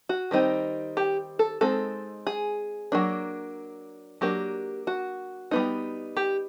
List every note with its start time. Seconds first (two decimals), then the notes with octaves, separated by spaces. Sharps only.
0.09 F#4
0.31 D#3 G3 C4 D#4
0.97 G4
1.39 A4
1.61 G#3 C4 D#4 A4
2.27 G#4
2.92 F#3 A#3 D4
4.21 F#3 A#3 D4 G4
4.87 F#4
5.51 G3 B3 D#4
6.17 G4